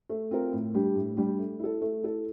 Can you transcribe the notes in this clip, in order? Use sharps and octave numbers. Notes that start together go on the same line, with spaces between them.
A3
C4 F4 A#4
A2
G3 D4 G4
A2
G3 D4 G4
A3
E4 A4
A3
E4 A4